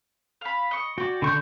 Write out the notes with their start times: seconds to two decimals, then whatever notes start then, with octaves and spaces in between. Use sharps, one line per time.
0.41 F5 B5
0.71 D#5 C#6
0.98 F#4 D5 G5
1.22 D3 C#6 G6